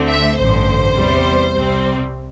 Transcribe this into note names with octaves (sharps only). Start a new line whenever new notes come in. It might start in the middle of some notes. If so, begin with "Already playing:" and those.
Already playing: D2 D3 A3 C4
E5
A1 G2 D3 C5
E2 C3 G3
C2 C3 G3 C4